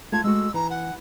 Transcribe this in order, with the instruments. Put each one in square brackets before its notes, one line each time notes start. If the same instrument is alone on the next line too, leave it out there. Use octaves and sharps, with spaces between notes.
[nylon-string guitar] A3 F4 A5 [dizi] G#6
[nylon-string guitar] G#3 A3 F#4 [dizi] E6
[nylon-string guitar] E3 [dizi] A#5
[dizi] F#5